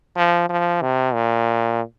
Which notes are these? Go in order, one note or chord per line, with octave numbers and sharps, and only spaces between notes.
F3
F3
C3
A#2